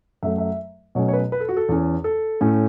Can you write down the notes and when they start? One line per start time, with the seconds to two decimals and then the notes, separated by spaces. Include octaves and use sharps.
0.23 F#2 F#3 A3 E5
0.38 E5
0.95 B2 F#3 A3 C#4 C#5
1.08 C#5
1.13 B4
1.32 B4
1.40 A4
1.49 F#4
1.57 A4
1.69 E2 E3 C#4
2.04 A4
2.41 A2 A3 C#4